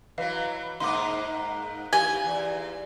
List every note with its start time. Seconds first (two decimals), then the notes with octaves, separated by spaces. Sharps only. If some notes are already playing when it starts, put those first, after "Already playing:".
0.18 E3 F#3 B4 D#5 F5
0.80 G#2 A#3 D#4 C6 D6
1.93 E3 G4 F5 G#5 G7
2.25 E2